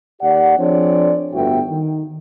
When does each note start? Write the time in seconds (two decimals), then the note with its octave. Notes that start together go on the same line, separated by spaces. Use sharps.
0.20 D#2 G4 D5 F#5
0.57 F3 C4 D4 G#4 C#5 D5
1.32 G1 A2 B3 F#4 E5 G5
1.68 D#3